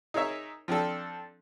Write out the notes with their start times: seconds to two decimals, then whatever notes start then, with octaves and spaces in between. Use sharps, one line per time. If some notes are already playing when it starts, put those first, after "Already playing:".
0.14 D#4 G#4 A#4 C#5 E5
0.68 F3 C4 D4 A4